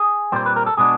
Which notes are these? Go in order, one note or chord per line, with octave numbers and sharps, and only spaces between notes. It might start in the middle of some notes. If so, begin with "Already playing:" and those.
Already playing: G#4
A#2 G3 C4 C5
B4
A#4
A4
B2 G#3 B3 D4 G#4